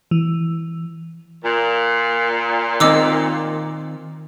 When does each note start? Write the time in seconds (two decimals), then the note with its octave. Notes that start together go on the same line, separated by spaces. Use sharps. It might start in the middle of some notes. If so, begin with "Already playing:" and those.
0.11 E3
1.44 A#2
2.80 D#3 C4 D#5 D6 E6